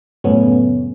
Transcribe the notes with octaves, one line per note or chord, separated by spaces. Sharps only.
F#2 A2 C#3 A3 B3 C#4